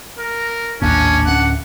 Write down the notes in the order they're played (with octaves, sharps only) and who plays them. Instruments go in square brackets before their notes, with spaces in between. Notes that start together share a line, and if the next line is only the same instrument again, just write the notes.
[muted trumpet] A#4
[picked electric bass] A1 D#2 A#2 [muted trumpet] C#4 [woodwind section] D4
[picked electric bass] D1 C#4 [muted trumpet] F#5